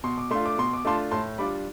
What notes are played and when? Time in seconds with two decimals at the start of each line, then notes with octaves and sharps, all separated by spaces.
0.04 B2 C6
0.18 D6
0.31 A3 D4 F4 C6
0.45 D6
0.58 B2 C6
0.73 D6
0.85 A3 D4 F4 A5 C6
1.11 A2 A5 C6
1.38 G3 D4 F4 B5 D6